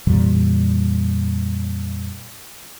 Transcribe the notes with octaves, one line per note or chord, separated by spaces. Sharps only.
F2 A#2 E3 G3